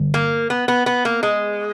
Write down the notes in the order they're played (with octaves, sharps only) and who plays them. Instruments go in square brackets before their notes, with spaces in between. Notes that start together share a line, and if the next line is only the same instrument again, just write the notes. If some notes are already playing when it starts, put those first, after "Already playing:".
Already playing: [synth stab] G1
[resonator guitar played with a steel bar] A#3
B3
B3
B3
A#3
G#3